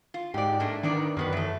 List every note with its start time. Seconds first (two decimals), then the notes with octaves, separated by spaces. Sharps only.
0.14 F4
0.34 G#2 G4 D5
0.60 A3 A#3 D4
0.83 D#3 B3 D4 D5
1.17 F#2 D#3 B3 B4
1.33 E3 A3